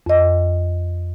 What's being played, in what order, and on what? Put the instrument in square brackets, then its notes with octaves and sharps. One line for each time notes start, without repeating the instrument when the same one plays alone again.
[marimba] F2 D#5